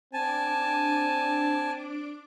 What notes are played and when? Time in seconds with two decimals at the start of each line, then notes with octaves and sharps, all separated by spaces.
0.13 C4 D4 G#5 A5 D6